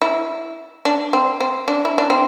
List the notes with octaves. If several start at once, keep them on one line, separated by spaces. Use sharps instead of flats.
E4
D4
C4
C4
D4
E4
D4
C4